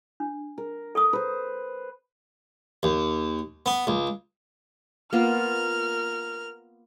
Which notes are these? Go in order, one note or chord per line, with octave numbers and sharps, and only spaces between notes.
D4
A#4
A4 C#6 D#6
B4 C5
D#2
B3
C#2
A#3 B3 F4 A#4 F6